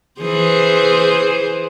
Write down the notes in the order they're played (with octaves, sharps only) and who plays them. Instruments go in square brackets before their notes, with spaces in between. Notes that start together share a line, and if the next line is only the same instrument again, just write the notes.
[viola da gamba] E3 G#4 C5